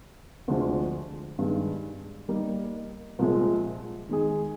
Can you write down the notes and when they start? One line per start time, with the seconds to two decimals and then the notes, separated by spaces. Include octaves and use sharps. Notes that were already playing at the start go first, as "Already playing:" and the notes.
0.48 D2 C3 F3 G#3 D4
1.39 G2 D#3 G#3
2.29 G3 A#3 D#4
3.19 C2 A#2 F3 G#3
4.09 D#3 G#3 D#4 G#4